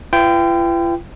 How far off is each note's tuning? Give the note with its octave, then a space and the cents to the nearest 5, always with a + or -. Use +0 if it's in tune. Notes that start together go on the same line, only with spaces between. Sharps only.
F4 -45 B4 +15 G5 +0